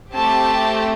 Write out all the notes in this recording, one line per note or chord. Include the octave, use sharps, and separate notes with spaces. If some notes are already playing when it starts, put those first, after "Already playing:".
A3 C4 G4 A5